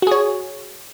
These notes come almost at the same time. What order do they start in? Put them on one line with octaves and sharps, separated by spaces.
F#4 G#4 C#5